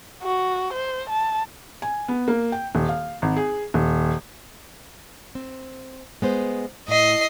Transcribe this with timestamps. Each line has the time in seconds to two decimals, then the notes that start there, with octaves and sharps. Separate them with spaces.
0.23 F#4
0.73 C5
1.09 A5
1.82 G#5
2.08 B3
2.28 A#3
2.52 G5
2.75 D#1
2.89 F5
3.22 G#1
3.36 G#4
3.74 D#1
5.35 C4
6.22 G#3 B3 C5
6.88 A2 D#5 C7